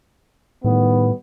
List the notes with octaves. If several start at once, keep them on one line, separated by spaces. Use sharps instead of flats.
A2 D#3 G3 B3